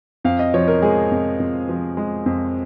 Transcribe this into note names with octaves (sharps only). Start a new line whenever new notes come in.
F2 F5
D#5
F3 C#5
A#4
G#3 G#4
F2
F2
F3
G#3
F2